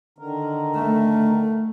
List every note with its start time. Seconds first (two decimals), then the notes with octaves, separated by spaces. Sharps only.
0.18 D3 D#3 A#4
0.75 A3